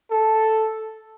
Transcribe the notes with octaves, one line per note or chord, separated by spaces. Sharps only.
A4